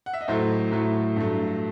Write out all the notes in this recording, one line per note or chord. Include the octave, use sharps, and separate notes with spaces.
F#5
E5
D#5
A2 F#3 A3 C5
A2 F#3 A3
G2 F#3 A3